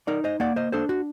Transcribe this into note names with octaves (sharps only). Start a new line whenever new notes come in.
D#4 A#4 D5
C5 D#5
A#3 D5 F#5
C5 D#5
D4 A4 C5
F#4